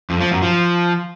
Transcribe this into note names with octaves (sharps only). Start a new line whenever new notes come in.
F2
F3
F#2
F3